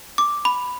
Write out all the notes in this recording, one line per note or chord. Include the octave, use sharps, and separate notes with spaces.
D6
B5